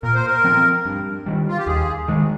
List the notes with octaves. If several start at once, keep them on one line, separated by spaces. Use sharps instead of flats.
A#2 A#4
C5
A#4
F3 C4
G2
D#3 G3
F4
G4
D#2 G#4
D#3 G#3